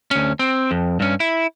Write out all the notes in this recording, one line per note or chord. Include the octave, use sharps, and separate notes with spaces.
D2 C#4
C4
F2
G2 C#4
E4